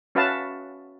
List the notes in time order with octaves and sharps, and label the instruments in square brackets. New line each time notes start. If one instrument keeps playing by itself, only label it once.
[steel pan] C#4 F#4 B4 E5 F5 A5